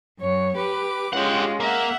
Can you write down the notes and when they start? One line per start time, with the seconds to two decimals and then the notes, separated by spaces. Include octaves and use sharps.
0.18 F#2 C#5
0.55 G4 B4 D6
1.13 G#3 C#4 F4 G4 F#5
1.60 A#3 E5 F#5